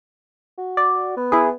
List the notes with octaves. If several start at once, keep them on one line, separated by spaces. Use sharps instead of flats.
F#4
D5
B3
E4 G#4